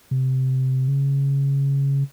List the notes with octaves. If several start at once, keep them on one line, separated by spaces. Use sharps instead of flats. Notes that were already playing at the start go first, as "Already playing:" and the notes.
C3
C#3